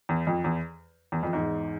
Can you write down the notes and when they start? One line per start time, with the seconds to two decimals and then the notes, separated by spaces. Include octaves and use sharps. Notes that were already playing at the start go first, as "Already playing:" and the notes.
0.09 E2
0.27 F2
0.44 E2
1.12 E2
1.23 F2
1.33 E2 G#2